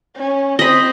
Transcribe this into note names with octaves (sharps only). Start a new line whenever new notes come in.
C#4
C4 D#5 B5